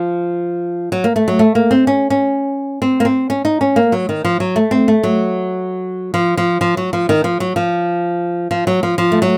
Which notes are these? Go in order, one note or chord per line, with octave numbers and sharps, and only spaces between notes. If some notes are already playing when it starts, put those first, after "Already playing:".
Already playing: F3
F#3
A#3
A3
F#3
A3
A#3
C4
C#4
C#4
C4
A#3
C4
C#4
D#4
C#4
A#3
F#3
D#3
F3
F#3
A3
C4
A3
F#3
F3
F3
F3
F#3
F3
D#3
F3
F#3
F3
F3
F#3
F3
F3
A3
F#3